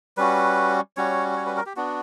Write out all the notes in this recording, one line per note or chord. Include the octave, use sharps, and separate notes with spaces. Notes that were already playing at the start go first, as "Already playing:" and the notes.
G3 C#4 F#4 B4
G3 C#4 F#4 C#5
C#5
B4
A#4
G4
B3 D4 F#4